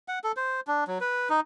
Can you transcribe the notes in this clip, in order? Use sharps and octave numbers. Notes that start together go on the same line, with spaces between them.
F#5
A4
C5
D4
F#3
B4
D#4